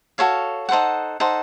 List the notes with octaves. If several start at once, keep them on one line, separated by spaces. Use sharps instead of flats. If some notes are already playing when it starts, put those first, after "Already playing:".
F#4 A4 C#5 F5
D#4 A4 C5 F#5
D#4 A4 C5 F#5